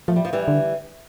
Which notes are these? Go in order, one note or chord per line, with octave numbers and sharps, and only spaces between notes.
F3 A3
G3
F3
E3 G3
D3